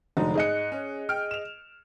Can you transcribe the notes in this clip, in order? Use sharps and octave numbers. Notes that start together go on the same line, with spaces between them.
F1 D3 F#3 G#3 D#4
G#2 G#4 D#5 F#6 C#7
C#4
G5 F6 D7
E7 F7